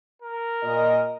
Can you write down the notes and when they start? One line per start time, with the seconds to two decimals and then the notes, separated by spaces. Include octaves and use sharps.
0.22 A#4
0.63 A#2 D#5